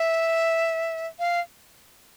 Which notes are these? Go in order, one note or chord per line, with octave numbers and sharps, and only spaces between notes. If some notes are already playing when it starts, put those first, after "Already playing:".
Already playing: E5
F5